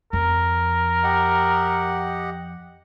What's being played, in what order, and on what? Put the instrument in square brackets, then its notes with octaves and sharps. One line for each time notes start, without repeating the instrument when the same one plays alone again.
[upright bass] F2 [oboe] A#4
[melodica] G4 D#5 F#5